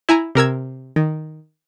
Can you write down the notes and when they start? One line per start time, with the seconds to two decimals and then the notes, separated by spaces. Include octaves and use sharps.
0.09 E4 G#5 A#5
0.35 C3 A#4 E6 G#6
0.96 D#3